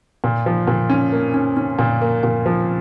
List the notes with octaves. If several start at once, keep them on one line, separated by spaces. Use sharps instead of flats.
A#2
F3
A#2
C#4
A#3
C#4
C#4
A#2
A#3
A#2
F3